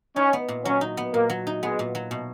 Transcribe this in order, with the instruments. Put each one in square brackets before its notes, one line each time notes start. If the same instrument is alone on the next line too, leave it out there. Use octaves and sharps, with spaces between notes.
[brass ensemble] C#4 [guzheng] D#4
[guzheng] B3
A#2
[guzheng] F#3 [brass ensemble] C#4
[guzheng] D#4
B3
[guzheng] A#2 [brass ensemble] A#3
[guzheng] F#3
D#4
[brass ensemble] G#3 [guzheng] B3
[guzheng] A#2
F#3
B2